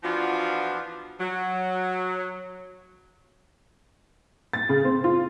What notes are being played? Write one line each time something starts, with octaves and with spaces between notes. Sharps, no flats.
E3 F3 B3 D4 F4 F#4
F#3
A6
C#3
C4
F4